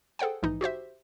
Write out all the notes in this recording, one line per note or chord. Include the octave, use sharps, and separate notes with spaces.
G#4 A4 C5 F#5 G5
A#1 G#2 E3 D#4
F#4 G4 C5 E5